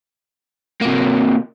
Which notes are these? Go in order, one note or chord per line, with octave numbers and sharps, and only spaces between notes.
C3 A#3